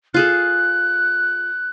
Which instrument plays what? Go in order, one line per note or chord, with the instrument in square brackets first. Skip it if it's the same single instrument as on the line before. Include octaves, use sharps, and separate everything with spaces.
[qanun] F4 G#4 A4 [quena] F#6